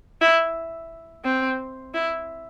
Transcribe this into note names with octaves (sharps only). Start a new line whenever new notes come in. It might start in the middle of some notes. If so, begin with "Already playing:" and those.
E4
C4
E4